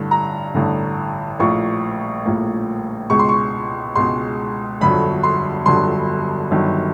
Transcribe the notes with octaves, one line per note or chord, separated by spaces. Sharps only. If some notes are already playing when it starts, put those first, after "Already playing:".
Already playing: A1 G2 D3
A#5
A1 G2 D3
A#1 A2 F3 A#3 C#6
A#1 A2 F3 A#3
C#2 B2 G#3 C#6
C6
C#6
C#2 B2 G#3 C6
G1 F2 D3 F#3 B5
C6
G1 F2 D3 F#3 C6
G1 G2 D#3 F#3